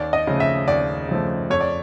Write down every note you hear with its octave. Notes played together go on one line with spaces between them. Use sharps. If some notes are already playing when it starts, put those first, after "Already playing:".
Already playing: D#2 D5
D#5
C#3 F3 A3
E5
D#2 D5
C#3 F3 A3
F2 C#5
D5